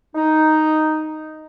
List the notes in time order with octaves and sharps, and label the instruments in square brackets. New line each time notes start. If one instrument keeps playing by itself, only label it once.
[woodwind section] D#4